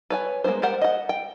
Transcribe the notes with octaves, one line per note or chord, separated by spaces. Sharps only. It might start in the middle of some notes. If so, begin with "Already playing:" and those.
B4 C#5 G#5
G#3 A#3 B3 E4 C5
G4 A#4 C5 F#5
D#5 F#5
G5